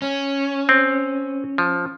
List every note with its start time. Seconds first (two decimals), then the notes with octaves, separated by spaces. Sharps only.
0.02 C#4
0.69 C4
1.58 F3